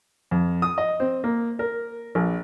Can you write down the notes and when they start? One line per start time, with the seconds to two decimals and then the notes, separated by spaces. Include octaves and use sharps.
0.31 F2
0.62 D#6
0.78 D#5
1.00 C4
1.24 A#3
1.59 A#4
2.15 A#1